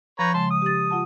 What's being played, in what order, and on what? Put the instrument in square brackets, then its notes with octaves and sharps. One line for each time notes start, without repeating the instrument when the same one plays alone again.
[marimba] F3 G6 [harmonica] B4 C#5 A#5
[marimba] C#3 G#3 [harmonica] A5 C6
[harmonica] D#6
[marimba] G4 A6
F4 F#5 A5